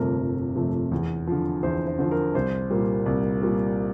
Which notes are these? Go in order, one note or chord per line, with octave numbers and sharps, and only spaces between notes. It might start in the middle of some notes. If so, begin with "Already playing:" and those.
Already playing: G1 F2 C3 F3 A3 A#4
G1
F2 C3 F3 A3
E2
D3 F3
E2 C5
C5
D3 F3 C5
A#4
C2 C5
A#2 G3 A#3
C2
A#2 G3 A#3